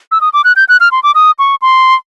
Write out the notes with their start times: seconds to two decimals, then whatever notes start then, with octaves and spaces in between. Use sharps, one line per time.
0.12 E6
0.21 D#6
0.33 D6
0.44 F#6
0.56 G6
0.69 F#6
0.80 F6
0.92 C6
1.03 D6
1.15 D#6
1.39 C#6
1.62 C6